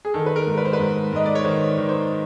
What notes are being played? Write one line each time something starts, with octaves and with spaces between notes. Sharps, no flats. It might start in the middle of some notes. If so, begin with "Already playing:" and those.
G#4
D#3 A4
B4
A#4
G#2
B4
C5
B4
G#2
G#2 D#5
D5
C#5
D#3 C5
D#3
C5